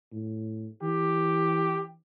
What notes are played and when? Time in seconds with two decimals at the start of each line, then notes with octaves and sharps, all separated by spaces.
0.12 A2
0.83 E3 G4